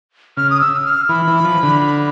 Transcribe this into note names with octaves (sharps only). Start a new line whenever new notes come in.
C#3 F6
D#6
E6
F6
E3 B5
E3
F3
D3